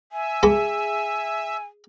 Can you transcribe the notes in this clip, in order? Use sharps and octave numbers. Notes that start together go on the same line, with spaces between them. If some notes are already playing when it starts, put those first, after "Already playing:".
E5 G#5
G#3 G#4 A4 B5